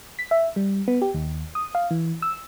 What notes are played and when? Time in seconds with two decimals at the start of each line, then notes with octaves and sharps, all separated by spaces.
0.19 B6
0.31 E5
0.56 G3
0.88 B3
1.02 G4
1.14 D#2
1.55 D#6
1.75 F5
1.91 E3
2.22 E6